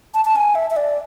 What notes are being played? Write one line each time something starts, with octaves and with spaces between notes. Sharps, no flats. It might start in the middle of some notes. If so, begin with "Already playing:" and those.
A5
A5
G#5
E5
E5
D5